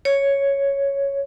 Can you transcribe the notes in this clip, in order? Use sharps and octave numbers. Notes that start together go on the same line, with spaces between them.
C#5